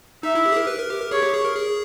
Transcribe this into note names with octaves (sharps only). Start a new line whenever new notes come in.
D#4 E5
E4
G4
G#4
A#4
B4
A#4
G4
A#4
G#4 C#5
G4
G#4
A#4
G#4